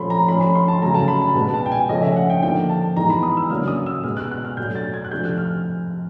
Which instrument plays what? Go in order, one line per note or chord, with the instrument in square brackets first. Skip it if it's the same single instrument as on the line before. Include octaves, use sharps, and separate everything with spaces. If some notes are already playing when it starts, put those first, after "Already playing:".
Already playing: [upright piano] A#2 F3 A3 C#4 B5 C6
A#5
F3 A3 C#4 B5
B5
C6
A5
C#3 F#3 A3 A#5
A5
B5
A5
B2 G#3 B3 A5
A5
G5
G#5
C#3 F3 A3 C#4 D#5
E5
F#5
G5
D3 F3 A#3 D#4 G5
A5
E3 G#3 B3 D#4 A#5
B5
D#6
E6
C#3 F#3 A#3 D4 F6
D#6
E6
B2 G#3 B3 F6
F#6
F#6
F6
B2 F#3 A3 D4 G6
A6
G#6
F#6
C3 F3 A3 D4 G6
F#6
F6